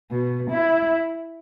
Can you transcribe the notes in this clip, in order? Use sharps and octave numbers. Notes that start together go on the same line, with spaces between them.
B2
E4